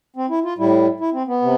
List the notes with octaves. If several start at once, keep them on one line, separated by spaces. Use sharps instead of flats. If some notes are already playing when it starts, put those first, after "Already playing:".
C4
E4
F4
A2 G3 E4
E4
C4
B3
C3